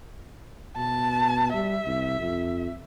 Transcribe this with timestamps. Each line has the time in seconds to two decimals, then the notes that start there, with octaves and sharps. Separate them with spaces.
0.77 B2 A5
1.54 G3 E5
1.86 C2
2.20 F2